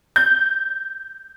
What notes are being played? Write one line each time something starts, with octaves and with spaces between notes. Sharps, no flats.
G6